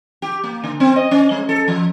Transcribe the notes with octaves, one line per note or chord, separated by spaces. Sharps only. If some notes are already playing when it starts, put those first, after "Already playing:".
G4
A#3
D3
C4
D#5
C#4
G#3
A4
F3